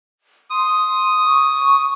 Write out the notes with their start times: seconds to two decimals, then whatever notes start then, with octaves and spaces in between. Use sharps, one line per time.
0.50 C6 D#6
1.25 C#6